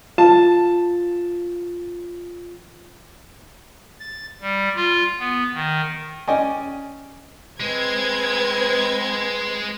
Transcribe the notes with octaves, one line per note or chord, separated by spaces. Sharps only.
F4 A5
A6
G3
F4
B3
D#3
C#4 D5 D#5 G5 G#5
G#3 C4 B4 G#6